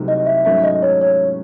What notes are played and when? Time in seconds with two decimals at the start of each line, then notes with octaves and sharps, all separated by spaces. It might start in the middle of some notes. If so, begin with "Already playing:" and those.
Already playing: C2 C3 F#3 A3 D#4
0.08 D#5
0.26 E5
0.45 G#2 F#3 A3 C#4 E5
0.64 D#5
0.83 C#5
1.01 C#5